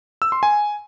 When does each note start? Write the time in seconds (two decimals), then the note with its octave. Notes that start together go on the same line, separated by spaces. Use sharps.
0.22 E6
0.32 C6
0.43 G#5